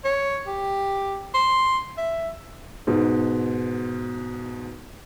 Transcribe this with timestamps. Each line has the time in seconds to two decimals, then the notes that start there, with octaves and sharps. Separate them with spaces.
0.04 C#5
0.47 G4
1.34 C6
1.97 E5
2.87 G#2 B2